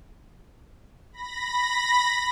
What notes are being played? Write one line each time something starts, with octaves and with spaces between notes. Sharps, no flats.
B5 A#6